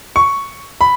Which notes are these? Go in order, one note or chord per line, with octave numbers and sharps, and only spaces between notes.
C#6
B5